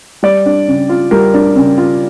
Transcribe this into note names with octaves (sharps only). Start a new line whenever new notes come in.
G3 D5
D4
C#3
F4
G3 A#4
D4
C#3
F4